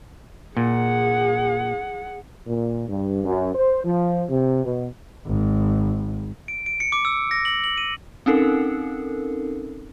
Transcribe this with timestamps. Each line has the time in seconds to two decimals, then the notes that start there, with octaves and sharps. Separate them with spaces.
0.57 A#2 G#4 F#5
2.47 A#2
2.88 G2
3.24 F#2
3.54 C5
3.84 F3
4.29 C3
4.63 B2
5.26 G#1
6.48 D7
6.66 D7
6.80 C#7
6.92 D6
7.05 E6
7.31 A#6
7.45 F#7
7.64 F#7
7.78 D#7
8.26 C4 C#4 D#4 A4 A#4